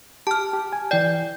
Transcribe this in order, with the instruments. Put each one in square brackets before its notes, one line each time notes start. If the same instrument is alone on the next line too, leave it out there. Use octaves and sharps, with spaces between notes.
[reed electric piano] G4 [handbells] A5 F6
[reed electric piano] G4
G#5
[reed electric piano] E3 G6 [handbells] D5 G5